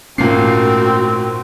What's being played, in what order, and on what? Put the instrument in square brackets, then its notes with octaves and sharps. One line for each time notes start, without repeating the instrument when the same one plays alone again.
[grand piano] G#1 A#2 C7 [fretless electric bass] A3 C#4 [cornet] C4 [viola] F#4 A#4